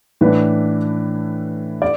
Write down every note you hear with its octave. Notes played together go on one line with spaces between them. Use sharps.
A2 E3 D4 B4
D5